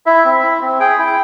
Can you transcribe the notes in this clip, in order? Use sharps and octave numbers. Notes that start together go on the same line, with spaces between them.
E4 E5
C4
E4
C4
G#4 G5
E4